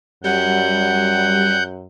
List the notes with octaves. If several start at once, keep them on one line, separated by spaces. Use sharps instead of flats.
F#2 G3 F#5 G6